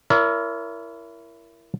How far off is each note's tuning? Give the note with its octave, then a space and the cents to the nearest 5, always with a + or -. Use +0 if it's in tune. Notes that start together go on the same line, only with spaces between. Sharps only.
E4 +20 A#4 +0 C#5 +45